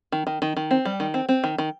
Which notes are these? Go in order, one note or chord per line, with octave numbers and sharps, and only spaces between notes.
D#3
D#3
D#3
D#3
C4
G3
D#3
C4
C4
D#3
D#3